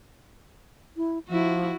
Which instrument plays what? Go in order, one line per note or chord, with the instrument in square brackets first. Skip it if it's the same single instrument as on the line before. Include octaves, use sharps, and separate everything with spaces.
[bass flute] E4
[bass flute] F3 [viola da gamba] E4 F#4